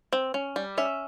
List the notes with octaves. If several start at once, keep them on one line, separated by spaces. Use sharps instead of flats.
C4
C#4
G3
C#4 E5